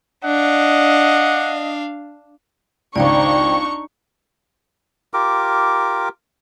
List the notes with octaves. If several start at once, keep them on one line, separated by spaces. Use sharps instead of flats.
D4 D#5 F5 F#5
G#1 C#2 D4 D#4 D5 G5 A#5 C#6
F4 G4 A#4 D6